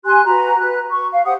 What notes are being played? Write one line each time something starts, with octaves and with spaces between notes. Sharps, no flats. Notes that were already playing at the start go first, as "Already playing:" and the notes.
G4 G#5 C6 F#6
F#4 B4 A#5
B4 F#6
C#6
F5
G4 C5 F#5 D#6